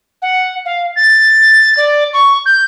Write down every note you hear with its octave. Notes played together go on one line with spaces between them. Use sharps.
F#5
F5
A6
D5
C#6
G6